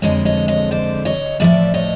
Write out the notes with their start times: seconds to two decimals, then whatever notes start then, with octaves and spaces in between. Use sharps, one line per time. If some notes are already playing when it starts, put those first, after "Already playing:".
0.02 F2 D3 F3 G#3 C#5 D#5
0.25 C#5 D#5
0.48 C#5 D#5
0.71 C5 D5
1.05 C#5 D#5
1.40 A2 F3 G#3 D5 E5
1.74 C#5 D#5